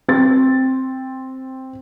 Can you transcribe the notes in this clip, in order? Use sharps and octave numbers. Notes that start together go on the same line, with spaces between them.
C4 A6